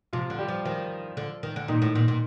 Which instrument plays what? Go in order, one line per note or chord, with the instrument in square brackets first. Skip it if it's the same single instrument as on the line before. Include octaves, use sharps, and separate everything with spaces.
[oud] C3 [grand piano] F3 F4
[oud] D3
[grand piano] G3 G4
[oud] F3
[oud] D#3 [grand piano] F3 F4
[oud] D3
D#3
D3
[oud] A#2 [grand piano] D#3 D#4
[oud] A2
A#2
A#2